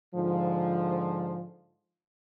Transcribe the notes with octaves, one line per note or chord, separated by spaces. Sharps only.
G#2 D3 F3